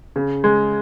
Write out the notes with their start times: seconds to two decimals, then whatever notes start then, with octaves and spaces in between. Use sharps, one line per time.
0.16 C#3
0.44 G#3